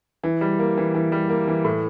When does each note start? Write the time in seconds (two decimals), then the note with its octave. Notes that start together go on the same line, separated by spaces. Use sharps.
0.24 E3
0.41 G3
0.59 A#3
0.77 E3
0.95 E3
1.12 G3
1.29 A#3
1.48 E3
1.64 A2